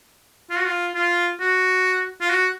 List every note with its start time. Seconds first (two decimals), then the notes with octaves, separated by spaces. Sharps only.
0.50 F4
0.58 F#4
0.67 F4
0.95 F4
1.40 F#4
2.21 F4
2.30 F#4